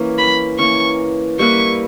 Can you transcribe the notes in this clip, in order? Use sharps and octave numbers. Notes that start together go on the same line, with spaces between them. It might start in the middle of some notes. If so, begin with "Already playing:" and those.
Already playing: E3 A#3 C#4
B5
E3 A#3 C#4 C#6
G3 A#3 E4 B4 C#6